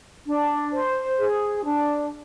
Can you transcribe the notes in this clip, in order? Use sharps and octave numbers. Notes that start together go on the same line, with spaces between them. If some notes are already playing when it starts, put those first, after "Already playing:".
D4
C5
G#4
D4